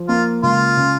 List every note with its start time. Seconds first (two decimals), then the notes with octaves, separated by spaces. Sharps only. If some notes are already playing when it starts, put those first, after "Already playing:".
Already playing: F3
0.08 A#3 F4
0.43 C#2 F4
0.77 C#3